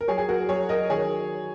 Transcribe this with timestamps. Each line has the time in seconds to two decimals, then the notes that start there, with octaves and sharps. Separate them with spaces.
0.01 A#4
0.08 F#3 G#4 C#5
0.18 G#4
0.29 F#4 A#4
0.49 F#3 G#4 C#5
0.69 A#4 D#5
0.90 D#3 G#4 C#5